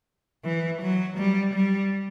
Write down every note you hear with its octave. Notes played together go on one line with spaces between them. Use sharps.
E3
F#3
G3
G3